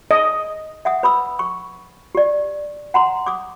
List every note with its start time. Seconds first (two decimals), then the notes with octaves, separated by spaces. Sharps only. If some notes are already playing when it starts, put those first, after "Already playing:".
0.11 D#5
0.85 E5 F#5 D#6
1.03 B4 B5 D#6 E6
1.39 C#6
2.15 G4 D5
2.94 F#5 A#5 C6
3.26 D6 D#6